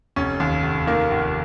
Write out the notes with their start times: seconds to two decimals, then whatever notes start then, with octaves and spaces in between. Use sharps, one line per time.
0.16 F1 C#4
0.40 D#2
0.63 F1
0.87 D#3 A#3
1.11 F1